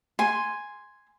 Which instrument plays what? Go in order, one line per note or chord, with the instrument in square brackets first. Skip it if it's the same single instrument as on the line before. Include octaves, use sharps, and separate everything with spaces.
[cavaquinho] G#5 C6